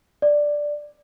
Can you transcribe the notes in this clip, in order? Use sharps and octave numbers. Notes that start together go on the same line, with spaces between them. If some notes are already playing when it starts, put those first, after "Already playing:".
D5